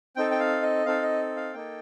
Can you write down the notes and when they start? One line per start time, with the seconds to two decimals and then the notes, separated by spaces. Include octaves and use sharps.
0.16 C4 D#4 A4 G5
0.31 G5
0.40 F5
0.62 D#5
0.86 C4 D#4 A4 F5
1.02 D#5
1.37 F5
1.54 A#3 D#4 A4 G5